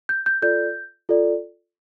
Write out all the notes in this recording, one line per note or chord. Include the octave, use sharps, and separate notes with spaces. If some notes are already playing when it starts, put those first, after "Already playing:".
G6
G6
F4 A4 D5 G6
F4 A4 D5